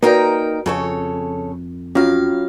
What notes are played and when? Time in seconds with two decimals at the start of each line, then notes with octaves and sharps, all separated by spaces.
0.03 A#3 D#4 F#4 A#4 B4 D5 G5
0.66 F2 C#3 A4 C#5
1.95 F#3 C#4 F4 F5